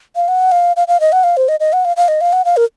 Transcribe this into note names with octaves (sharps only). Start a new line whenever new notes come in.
F5
F#5
F5
F5
F5
D#5
F#5
F5
C5
D#5
D#5
F#5
F5
F5
D#5
F5
F#5
F5
A#4